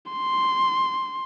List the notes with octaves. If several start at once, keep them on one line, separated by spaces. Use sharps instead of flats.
C6